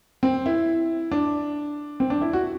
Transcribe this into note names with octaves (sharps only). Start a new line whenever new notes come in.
C4
E4
D4
C4
D4
E4
F#4